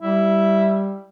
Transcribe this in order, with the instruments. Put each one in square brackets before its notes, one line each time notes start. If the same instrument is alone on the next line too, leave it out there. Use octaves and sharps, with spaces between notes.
[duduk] G3 [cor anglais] E4